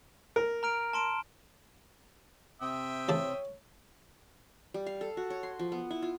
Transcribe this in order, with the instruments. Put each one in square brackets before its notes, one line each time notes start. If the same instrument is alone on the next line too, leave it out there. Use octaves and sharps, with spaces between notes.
[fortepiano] A#4
[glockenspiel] A#5 F6 D7
A5 C6 D7
[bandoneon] C3 C4 [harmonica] E5 G5 D#6
[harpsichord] A1 C#3 A5 [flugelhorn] C#5
[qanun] G3
F5
A4
F#4
C#5
C6
F3
B3
E4
F4